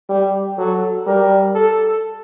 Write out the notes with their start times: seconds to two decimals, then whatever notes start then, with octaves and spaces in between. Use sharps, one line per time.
0.10 G3 G4
0.58 F#3 A4
1.07 G3 A#4
1.55 A4